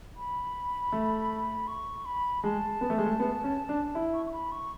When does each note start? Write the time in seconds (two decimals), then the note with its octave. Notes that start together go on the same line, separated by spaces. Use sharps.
0.17 B5
0.92 A3
1.68 C#6
2.05 B5
2.44 G#3 A5
2.81 B3
2.90 A3
2.98 G#3
3.06 A3
3.20 B3
3.44 C#4
3.69 D4
3.95 E4
4.14 C#6
4.26 C#6
4.32 B5
4.52 C#6